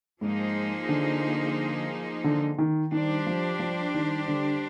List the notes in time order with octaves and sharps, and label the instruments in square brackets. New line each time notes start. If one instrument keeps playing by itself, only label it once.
[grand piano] G#2 [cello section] F3 A#3 D#4 G#4 C5
[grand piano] D3
D3
D#3
[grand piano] D#3 [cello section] G3 D4 G4 C5
[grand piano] F3
F3
D#3
D3